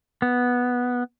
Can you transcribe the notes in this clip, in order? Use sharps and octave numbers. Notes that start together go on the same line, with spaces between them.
B3